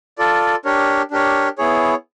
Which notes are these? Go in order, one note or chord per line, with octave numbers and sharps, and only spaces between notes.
F4 A4 D5
D4 G4 A#4 C#5
D4 G4 A#4 C#5
B3 E4 G#4 C#5